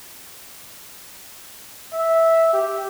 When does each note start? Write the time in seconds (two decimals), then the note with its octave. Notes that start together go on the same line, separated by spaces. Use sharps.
1.93 E5
2.53 G4